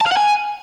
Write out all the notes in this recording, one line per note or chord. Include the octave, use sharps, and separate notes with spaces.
A5
F5
F#5
G#5